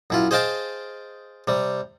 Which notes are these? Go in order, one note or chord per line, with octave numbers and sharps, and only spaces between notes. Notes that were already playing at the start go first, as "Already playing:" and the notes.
F#2 E4 F4
G#4 C5 D#5 F5 G5 A5
C3 G3